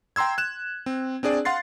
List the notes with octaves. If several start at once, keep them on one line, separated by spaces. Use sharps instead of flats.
G5 A#5 C6 E6 G#6
F#6 E7
C4
C4 D4 G#4 D5
F5 F#5 C6 A6 C7